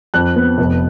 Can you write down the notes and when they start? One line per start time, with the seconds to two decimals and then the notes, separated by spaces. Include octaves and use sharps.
0.14 F2 F#6
0.36 B3
0.58 F1